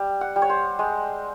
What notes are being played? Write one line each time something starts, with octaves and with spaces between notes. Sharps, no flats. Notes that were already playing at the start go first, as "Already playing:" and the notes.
Already playing: G3
F#5
G3
C#5
C5
G#3